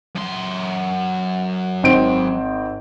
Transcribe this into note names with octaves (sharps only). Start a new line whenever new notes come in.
F#2 C6
G#1 C4 D7